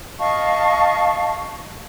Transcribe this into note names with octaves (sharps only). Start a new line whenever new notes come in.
D#5 F5 A5 C#6